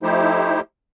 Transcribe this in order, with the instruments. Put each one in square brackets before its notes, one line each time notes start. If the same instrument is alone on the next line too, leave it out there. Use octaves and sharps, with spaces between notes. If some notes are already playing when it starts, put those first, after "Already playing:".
[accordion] F3 A3 D#4 E4 G4 C5